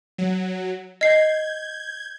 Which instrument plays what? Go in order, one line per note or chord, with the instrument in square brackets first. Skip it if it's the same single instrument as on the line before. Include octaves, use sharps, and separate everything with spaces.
[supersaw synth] F#3
[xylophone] D#5 C7 [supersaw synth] G6 G#6